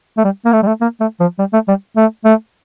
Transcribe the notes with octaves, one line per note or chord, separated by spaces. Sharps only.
A3
G3
A#3
A3
G3
A3
A#3
A3
F3
G3
A3
G3
A3
A3